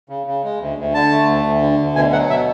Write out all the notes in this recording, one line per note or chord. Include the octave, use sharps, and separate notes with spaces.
C#3
C#3
G#3
D2
D2
D3 A5
A3
D2
D2
D3
D2
B2 G#5
F#3 F#5
B2 E5